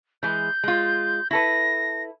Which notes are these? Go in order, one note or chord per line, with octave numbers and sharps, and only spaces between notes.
E3 G#3 G6
G#3 F4
E4 A4 B4 A#6